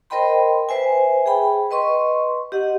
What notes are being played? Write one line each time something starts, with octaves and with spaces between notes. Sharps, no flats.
A#4 C5 D#5 G5 B5 C6
B4 C5 E5 G#5
G#4 G5 B5
B4 D#5 C6 C#6
G4 D#5 F#5